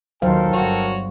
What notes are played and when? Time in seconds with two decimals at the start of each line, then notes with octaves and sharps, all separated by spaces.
0.22 D#2 D#3 F#3 A4 A#4 C5 F5 G5
0.53 G1 D3 F#4 C#5